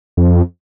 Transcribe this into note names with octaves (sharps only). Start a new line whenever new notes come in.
F2